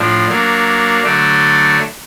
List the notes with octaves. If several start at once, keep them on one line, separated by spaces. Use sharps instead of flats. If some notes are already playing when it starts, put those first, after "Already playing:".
Already playing: A2 F3 D4
F#3 A#3 D4
D3 F#3 A3 D4